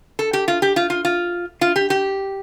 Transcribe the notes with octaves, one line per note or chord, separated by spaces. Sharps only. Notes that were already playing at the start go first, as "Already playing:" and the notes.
A4
G4
F4
G4
F4
F4
F4
F4
G4
G4